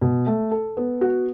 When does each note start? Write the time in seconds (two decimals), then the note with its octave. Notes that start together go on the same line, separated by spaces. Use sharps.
0.01 B2
0.27 A3
0.51 A4
0.77 B3
1.01 F#4